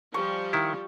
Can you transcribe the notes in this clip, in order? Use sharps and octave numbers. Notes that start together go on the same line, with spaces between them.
F3 G3 G4 C#6
D#3 E4